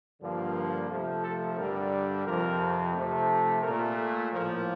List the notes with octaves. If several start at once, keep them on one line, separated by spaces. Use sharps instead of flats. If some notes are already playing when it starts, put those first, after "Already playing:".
G2 D3 F3 A#3
C3 F3 A3
A4
G2 D3 G3 A#4
F2 C3 F3 A#4
C3 F3 A3
A#2 A3 A#4
A2 F3 A#3 A#4